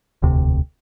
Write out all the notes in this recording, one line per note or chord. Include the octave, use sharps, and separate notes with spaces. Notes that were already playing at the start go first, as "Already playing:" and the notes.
E1 D2 C3